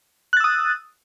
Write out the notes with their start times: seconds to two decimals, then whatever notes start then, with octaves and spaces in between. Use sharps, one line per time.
0.33 F#6
0.37 A6
0.40 E6
0.44 D#6